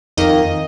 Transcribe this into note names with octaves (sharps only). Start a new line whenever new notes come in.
F2 D#3 A#3 D#5